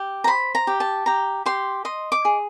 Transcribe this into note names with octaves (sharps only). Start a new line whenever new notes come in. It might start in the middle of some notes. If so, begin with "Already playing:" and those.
Already playing: G4
A#5
C5 B5
A#5
G4
A5
G4 A#5
G4 C6
D#5 C6
D6
G#4